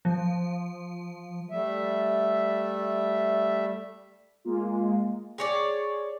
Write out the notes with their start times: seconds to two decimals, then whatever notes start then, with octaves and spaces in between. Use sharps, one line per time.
0.05 F3
1.49 G3 A3 E5
4.45 G#3 A#3 F4
5.38 G#4 C#5 D5